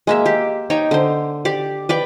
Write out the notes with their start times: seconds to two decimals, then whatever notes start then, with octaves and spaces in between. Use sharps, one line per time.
0.07 G#3 A#3 E5
0.26 G4
0.70 D#4 C#5 G5
0.91 D3 C5
1.45 G4 D5
1.89 B4 D5 G5